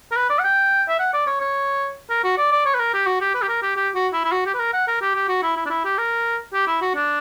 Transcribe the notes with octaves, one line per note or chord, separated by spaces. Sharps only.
A#4
B4
D5
F#5
G5
E5
F#5
D5
C#5
C#5
A#4
F#4
D5
D5
C#5
B4
A#4
G4
F#4
G4
B4
G4
A#4
G4
G4
F#4
E4
E4
F#4
G4
B4
A#4
F#5
A#4
G4
G4
F#4
E4
E4
D4
E4
G4
A#4
G4
E4
F#4
D4